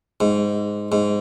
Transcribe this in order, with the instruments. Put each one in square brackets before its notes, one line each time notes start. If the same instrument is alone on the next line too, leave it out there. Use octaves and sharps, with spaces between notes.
[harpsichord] G#2
G#2